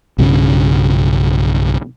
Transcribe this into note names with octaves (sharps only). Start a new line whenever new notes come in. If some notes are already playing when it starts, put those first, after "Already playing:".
B1 G2 C#3 C#4